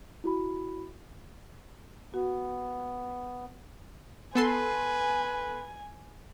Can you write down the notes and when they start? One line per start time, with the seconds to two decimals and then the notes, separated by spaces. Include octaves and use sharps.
0.24 E4 F#4 B5
2.14 B3 F#4
4.35 B3 A4 B4 G#5 C6